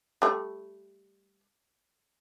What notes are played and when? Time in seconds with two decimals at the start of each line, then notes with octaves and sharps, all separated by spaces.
0.22 G3 A3